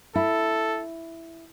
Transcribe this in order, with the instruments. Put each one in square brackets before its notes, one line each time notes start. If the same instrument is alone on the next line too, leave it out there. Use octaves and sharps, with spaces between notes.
[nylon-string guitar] E4 [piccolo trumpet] A4